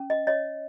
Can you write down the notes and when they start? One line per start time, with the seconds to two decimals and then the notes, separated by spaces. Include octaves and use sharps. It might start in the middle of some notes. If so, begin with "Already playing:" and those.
Already playing: C#4
0.10 D#5
0.27 C#5 D#5